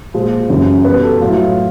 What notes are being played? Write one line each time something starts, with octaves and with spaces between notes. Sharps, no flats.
A#2 F3 G#3
F#2 C#3 E3 G3
B2 G3 B4
A4
A2 F#3 F4
E4
F4